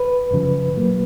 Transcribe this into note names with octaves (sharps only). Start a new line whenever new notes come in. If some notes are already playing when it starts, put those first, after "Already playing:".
Already playing: B4
F#2 C#3 F3
A#2 F#3 A#3